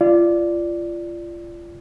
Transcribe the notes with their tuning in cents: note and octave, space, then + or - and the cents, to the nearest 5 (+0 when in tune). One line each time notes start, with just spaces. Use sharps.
F4 -30 D5 +0